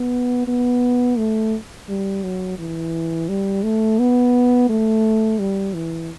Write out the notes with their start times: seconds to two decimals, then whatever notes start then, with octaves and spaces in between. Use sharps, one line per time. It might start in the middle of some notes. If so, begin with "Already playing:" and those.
Already playing: B3
0.48 B3
1.18 A3
1.89 G3
2.23 F#3
2.59 E3
3.29 G3
3.63 A3
3.99 B3
4.69 A3
5.39 G3
5.74 E3